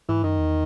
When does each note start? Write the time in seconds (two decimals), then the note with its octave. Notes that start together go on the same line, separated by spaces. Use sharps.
0.09 G#2 E3
0.23 F#2 D#3
0.39 E2